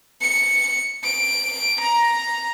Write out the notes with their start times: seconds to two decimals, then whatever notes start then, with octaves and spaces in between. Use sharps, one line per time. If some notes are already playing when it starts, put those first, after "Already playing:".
0.21 C#7
1.04 D7
1.80 A#5